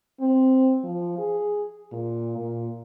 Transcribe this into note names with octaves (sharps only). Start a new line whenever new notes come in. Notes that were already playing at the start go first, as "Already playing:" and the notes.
C4
F3
G#4
A#2
A#2